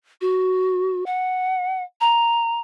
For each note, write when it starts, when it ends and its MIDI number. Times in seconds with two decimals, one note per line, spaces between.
0.21 1.04 66
1.06 1.83 78
2.01 2.61 82